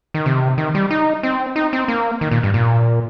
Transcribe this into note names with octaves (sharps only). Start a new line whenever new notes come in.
D#3
C3
D#3
G3
D#4
C4
D#4
C4
A#3
D#3
A#2
G2
A#2